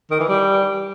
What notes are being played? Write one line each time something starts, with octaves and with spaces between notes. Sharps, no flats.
D#3
E3
G3